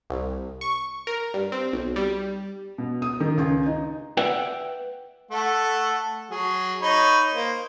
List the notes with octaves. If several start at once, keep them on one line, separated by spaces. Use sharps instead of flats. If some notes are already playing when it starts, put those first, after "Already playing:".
C2
C#6
A#4
G2
C4
B1
G3
B2
D#6
D#3
C#2
D#4
B4 D5 E5 F#5 G5
A3 A4 F#5
F#3 G#4
D#4 C#5 B5
A#3 C5